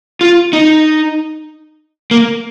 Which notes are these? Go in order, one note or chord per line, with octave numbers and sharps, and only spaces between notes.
F4
D#4
A#3